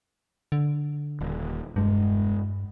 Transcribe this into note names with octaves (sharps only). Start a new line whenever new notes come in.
D3
D#1
E1 G2 G#3